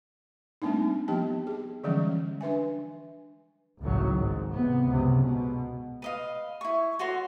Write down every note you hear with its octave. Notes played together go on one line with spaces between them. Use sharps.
G3 A3 A#3 C4 D4 D#4
F3 B3 G4 G5 A5
G#4
D3 E3 F3 G3 G#3 C#4
D4 B4 E5 G#5
G#1 C#2 A2 D#3 F#3
G#2
C3 B3
C#2 F#2 C3
B2
B4 D#5 F5
E4 C#6
F#4 A4 C#5 C6